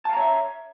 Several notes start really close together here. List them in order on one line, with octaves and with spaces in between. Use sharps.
A5 F5 A#5 C#5 E5